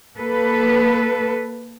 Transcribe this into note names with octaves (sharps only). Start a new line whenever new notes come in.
A#3 A4 B4